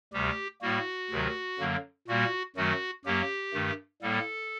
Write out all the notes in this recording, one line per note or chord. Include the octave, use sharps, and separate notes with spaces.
D2 C3 G3 G4
A2 G3 A#3 F#4
D2 C3 D#3 F#3
F#2 D3 F#3 A#3
A#2 G3 A#3 F#4
F#2 D#3 F#3 A3 F#4
F#2 F#3 A#3 G4
G2 D#3 A3
A2 G3 A#3 A4